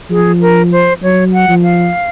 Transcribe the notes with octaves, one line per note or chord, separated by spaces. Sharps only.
F3 G#4
A#4
C5
F#3 C#5
F#5
F3
F5